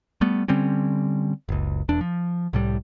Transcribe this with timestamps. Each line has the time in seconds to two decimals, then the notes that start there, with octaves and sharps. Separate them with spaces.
0.21 G3 A3 B3
0.48 D3 G3 C4 C#4
1.49 F#1 C#2
1.88 E1 E2 D4
2.01 F3
2.53 C2 A2 G3